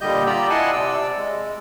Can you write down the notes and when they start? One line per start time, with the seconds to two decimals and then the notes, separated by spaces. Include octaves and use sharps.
0.01 A#2 D3 G3 G4 D#5 G6
0.27 F4 G4 D5 A#5 B5 E6
0.50 E4 D#5 F#5 G#5 A5 C6
0.73 C3 D5 E6
1.17 G#3